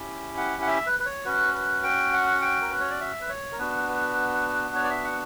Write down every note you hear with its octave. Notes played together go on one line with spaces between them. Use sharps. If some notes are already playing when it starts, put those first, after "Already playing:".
Already playing: C#4 E4 G4
F#5
F#5
E5
B4
B4
C#5
C#4 F#4 B4
B4
G5
F#5
G5
A#4
B4
C#5
D5
E5
B4
C#5
A#4
B3 D4 F#4 B4
B4
C#5
D5
E5
F#5